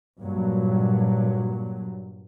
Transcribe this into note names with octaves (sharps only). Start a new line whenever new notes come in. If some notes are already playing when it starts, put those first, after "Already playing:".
G2 A#2 F#3